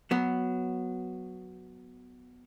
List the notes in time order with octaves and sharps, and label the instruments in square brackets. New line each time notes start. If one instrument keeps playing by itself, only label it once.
[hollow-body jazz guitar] F#3 B3